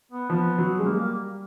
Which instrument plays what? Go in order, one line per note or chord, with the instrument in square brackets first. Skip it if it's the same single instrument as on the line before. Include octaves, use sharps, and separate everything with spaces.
[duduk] B3
[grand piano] F3 [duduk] B3
[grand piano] F#3
G#3
[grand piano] G3 [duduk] A#3
[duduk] A#3